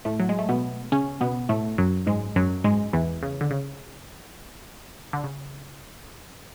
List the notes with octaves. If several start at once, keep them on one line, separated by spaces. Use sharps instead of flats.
A2 A3
F#3
G#3
A3
B2 B3
C#3 C#4
B2 B3
A2 A3
F#2 F#3
G#2 G#3
F#2 F#3
G#2 G#3
E2 E3
C#3
D3
C#3
D3
C#3